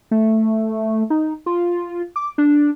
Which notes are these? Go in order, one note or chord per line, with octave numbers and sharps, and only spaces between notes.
A3
D#4
F4
D6
D4